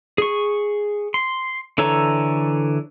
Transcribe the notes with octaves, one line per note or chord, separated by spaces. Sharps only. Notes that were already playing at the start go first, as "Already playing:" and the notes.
G#4 C#6
C6
D3 E3 A4 C#5 A#5